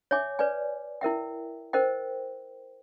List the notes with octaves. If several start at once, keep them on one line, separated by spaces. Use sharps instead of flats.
C#5 E5 G#5 D6
B4 C#5 D5 G#5
E4 A#4 E5 G5
A#4 C5 D#5 G5